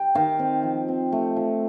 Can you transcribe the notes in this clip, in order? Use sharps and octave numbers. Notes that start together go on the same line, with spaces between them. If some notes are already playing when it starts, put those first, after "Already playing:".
Already playing: G5
D#3 F5
C4
F3
C4
A3
F3